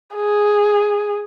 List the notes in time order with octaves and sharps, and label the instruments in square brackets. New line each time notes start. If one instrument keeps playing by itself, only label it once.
[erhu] G#4